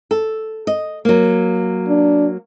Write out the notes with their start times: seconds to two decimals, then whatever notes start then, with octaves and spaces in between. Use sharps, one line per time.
0.11 A4
0.67 D#5
1.05 F#3 A#3
1.88 D4